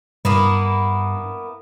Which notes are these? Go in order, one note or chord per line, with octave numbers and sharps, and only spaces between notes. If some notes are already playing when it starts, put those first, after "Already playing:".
G2 A#3 B3 E4